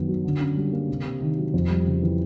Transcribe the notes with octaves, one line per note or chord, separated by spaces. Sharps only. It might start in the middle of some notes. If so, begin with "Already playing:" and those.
Already playing: F#2 D#3 B3
F#3
D3
C#4
G3
A#3
C3
C3
D#3
F#3
F2
G3
C#3
E3